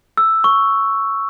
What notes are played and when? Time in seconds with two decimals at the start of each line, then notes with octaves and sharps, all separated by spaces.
0.17 E6
0.44 C#6